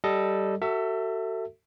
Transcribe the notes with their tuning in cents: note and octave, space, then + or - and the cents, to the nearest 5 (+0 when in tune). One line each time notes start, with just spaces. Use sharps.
G3 -10 A4 +0 D#5 +0
F#4 +30 A4 +35 E5 +0